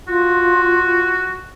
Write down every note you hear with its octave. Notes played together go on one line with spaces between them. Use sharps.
F4 F#4